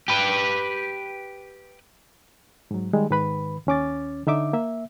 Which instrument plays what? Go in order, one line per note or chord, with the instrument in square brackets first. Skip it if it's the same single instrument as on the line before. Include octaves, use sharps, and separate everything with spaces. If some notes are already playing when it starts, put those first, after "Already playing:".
[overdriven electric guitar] G4 B4
[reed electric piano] G#2 F#3
D#3 G3 G#3
G#2 D#3 B4 B5
D#2 C#4 D6 A6
D3 D#4 E5 D6
A#3 E5